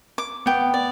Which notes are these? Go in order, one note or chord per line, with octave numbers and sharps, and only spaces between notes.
D6
B3 G5
D5